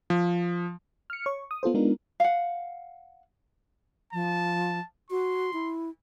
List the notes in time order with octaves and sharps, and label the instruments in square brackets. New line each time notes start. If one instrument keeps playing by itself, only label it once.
[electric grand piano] F3
[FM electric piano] F6 C#7
C#5 C#6
D#6
B3 F4 A4 C5
G#3 B3 D4 D#4 F4 A#4
[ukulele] F5 F#5
[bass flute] F3 [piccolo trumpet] A5
[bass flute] F#4 [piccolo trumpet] C6
[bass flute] E4